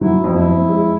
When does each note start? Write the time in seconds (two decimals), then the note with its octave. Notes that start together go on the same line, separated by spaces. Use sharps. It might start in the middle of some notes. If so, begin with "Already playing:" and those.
0.01 F#3 E4
0.24 F2
0.35 E4
0.46 F2
0.68 G#3